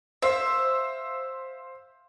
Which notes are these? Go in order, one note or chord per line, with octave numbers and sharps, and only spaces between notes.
C5 E5 F5